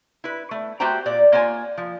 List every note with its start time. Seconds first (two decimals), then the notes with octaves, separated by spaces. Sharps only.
0.24 E4 B4
0.51 A3
0.80 A3 F#4 G4 C5 G5 A#5
1.06 A#2 D5
1.32 A#3 F4 C#5 G#5
1.77 F3